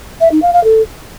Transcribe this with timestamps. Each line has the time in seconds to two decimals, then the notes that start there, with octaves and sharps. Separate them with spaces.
0.20 E5
0.31 D#4
0.42 F5
0.53 F5
0.64 A4